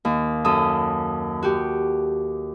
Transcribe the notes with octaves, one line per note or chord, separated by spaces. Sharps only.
D#2
F#2 A4 D#6
F#4 G4